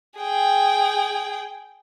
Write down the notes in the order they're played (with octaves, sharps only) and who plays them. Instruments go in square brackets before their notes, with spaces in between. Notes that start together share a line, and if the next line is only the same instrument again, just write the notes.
[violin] G#4 G5